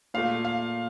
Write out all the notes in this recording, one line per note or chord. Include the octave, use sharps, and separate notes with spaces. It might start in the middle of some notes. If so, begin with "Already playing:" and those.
A#2 A3 F5
F5